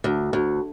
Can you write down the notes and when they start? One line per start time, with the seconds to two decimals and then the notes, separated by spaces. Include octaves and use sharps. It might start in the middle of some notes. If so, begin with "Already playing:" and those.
0.04 D2
0.33 D2